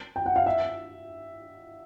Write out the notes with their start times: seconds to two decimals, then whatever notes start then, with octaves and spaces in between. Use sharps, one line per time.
0.16 G5
0.26 F#5
0.36 F5
0.46 E5